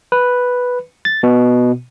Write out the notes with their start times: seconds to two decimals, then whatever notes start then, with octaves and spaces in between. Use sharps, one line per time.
0.12 B4
1.05 A6
1.23 B2